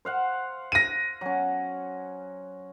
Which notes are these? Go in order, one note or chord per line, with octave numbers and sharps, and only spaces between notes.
C5 F5 F#5
A#6 D#7
F#3 C#4